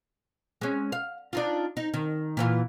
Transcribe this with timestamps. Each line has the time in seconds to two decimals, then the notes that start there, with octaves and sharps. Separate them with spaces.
0.61 G#3 C#4
0.92 F5
1.33 D4 D#4 F4
1.77 D#4
1.94 D#3
2.37 A#2 E3 F4